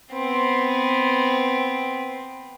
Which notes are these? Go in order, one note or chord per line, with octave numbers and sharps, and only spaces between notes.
B3 C4